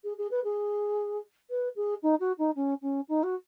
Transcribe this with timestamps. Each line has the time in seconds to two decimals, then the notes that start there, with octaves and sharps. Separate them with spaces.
0.04 G#4
0.18 G#4
0.31 B4
0.44 G#4
1.50 B4
1.76 G#4
2.03 D#4
2.20 F#4
2.38 D#4
2.56 C#4
2.82 C#4
3.08 D#4
3.23 F#4